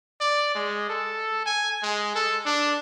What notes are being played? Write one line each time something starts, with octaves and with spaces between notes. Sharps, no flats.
D5
G#3
A4
G#5
G#3
A4
D4